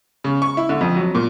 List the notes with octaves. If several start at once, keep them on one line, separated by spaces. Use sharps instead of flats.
C#3
C#6
E4
D3
F2
F#3
A#2